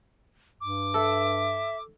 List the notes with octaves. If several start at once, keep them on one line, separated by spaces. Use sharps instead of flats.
G2 D6
A4 E5